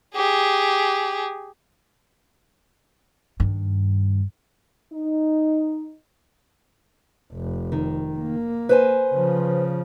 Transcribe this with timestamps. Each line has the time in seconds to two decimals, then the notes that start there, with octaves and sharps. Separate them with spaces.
0.15 G4 G#4
3.40 G2 D#3
4.93 D#4
7.32 F1
7.72 D#3
8.18 A#3
8.69 B4 C5 G#5
9.12 C#3 F3